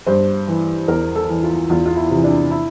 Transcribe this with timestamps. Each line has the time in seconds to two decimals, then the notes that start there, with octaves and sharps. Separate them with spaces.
0.06 G2 C5
0.47 E3
0.88 E2 A#4
1.15 A4
1.28 E3
1.43 F4
1.69 E2 F4
1.86 F4
1.96 E4
2.10 C3 E3
2.24 D4
2.51 E4